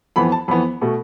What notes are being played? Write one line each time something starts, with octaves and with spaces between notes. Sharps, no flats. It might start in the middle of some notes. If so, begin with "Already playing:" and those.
F2 E3 B3 B5
A5
F2 E3 B3 B5
B2 A3